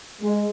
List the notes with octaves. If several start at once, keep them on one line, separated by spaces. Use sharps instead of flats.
G#3